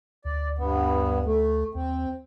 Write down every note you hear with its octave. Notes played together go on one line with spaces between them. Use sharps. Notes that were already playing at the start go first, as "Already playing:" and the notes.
D2 D5
G2 B3
A3
D#2 C4